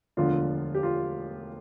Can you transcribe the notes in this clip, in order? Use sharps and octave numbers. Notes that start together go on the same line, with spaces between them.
E1 D2 D3 F3 F4
G4
F4